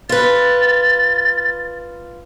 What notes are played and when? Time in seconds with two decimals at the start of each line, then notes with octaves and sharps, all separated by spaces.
0.09 F4 B4 A6